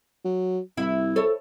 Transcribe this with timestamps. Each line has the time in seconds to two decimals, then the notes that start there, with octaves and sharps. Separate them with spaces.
0.25 F#3
0.77 C2 E4
1.16 A4 C#5